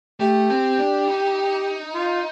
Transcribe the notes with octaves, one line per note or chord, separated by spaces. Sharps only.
A3 G4
C4
D4
D#4
F4